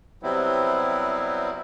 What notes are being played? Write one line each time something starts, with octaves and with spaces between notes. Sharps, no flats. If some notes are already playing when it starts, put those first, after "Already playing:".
C3 F#3 G3 B3 C4 E4